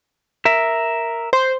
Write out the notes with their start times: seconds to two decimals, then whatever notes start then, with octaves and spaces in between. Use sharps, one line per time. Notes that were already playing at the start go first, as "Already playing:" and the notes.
0.45 A#4 E5
1.33 C5